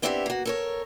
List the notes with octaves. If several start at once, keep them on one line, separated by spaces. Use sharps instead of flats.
B3 C4 D4 E4 F4 G4
A#3 F#4
A4 A#4 C#5